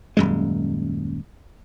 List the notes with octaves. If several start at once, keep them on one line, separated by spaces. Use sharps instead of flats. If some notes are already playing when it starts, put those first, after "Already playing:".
D#1 F#2 G#3